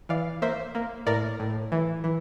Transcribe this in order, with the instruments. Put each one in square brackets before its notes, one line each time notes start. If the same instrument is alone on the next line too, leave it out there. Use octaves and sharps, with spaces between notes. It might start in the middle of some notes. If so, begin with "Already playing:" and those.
[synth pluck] E3 D5 F5
A#3 C5 E5
A#3
A2 A#4 D5
A2
E3
E3